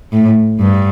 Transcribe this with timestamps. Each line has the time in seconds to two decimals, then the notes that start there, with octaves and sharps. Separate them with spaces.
0.13 A2
0.60 G2